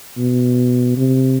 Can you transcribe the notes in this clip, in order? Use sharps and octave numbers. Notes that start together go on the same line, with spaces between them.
B2
C3